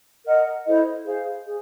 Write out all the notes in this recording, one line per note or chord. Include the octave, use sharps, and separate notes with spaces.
A#4 D#5 F#5
E4 A4 C5 D#5
G#4 C5 F5
G#4